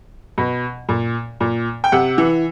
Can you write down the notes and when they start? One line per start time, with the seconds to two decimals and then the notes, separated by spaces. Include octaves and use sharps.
0.38 B2
0.89 A#2
1.41 A#2
1.84 G5
1.92 C3 F#5
2.18 E3